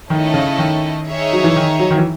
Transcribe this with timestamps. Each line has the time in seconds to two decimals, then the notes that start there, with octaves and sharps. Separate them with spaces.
0.10 D#3 A3 C#4 E4 A4 D#5
0.34 C#3
0.59 D#3
1.07 D#4 G#4 C#5 E5
1.33 F#3
1.44 E3
1.56 D#3
1.80 F#3
1.91 D#3
1.97 E3